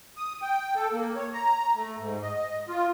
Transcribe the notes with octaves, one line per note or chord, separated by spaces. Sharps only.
D#6
G5
A4
A#3
C#5
A#5
A3
G#2
D#5
F4